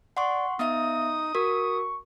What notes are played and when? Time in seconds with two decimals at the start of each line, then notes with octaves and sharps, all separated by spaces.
0.17 D5 F#5 C6 C#6
0.59 B3 D#4 E5 D#6
1.35 F#4 A#4 C#6